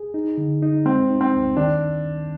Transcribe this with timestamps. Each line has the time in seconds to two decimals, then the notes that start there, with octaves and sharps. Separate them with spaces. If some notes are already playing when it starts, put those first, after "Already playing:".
Already playing: G#4
0.14 D#4
0.38 D3
0.62 D#4
0.85 G#3 C4
1.09 D#4
1.21 C4
1.33 D2
1.56 D#3 D4